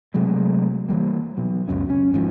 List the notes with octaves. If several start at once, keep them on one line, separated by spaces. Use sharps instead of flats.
C3 F#3 G#3 A3
E3 F3 G3 A#3
B2 F#3
C#2 F#2 F#3 C#4
C#4
G#1 G#2 C#3 F3